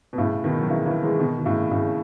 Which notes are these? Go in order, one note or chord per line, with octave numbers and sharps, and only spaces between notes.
B2
A2 C#3
B2 D#3
F#3
C#3 E3
C#3 E3
E3 G#3
B2 D#3
D#3
A2 C#3
A2 C#3